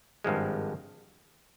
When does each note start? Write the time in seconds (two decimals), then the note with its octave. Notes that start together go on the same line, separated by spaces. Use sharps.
0.24 G#1 G2 F3 G#3